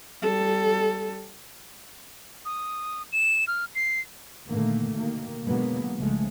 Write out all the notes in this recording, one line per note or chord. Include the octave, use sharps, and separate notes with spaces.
G3 A4
D#6
E7
F6
C7
A#2 D3 D#3 A3 A#3
B2 D#3 A#3
B2 D3 F#3 G#3 A#3 B3
B1 C#3 F3 G#3 A3